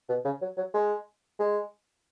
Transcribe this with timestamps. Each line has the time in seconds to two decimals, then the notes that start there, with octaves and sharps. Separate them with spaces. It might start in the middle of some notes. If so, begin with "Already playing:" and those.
0.09 B2
0.25 C#3
0.41 F#3
0.57 F#3
0.74 G#3
1.39 G#3